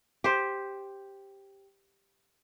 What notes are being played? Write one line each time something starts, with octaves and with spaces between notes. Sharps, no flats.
G4 C5